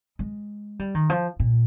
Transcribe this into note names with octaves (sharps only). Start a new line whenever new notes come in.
G#3
G3
D#3
F3
A#2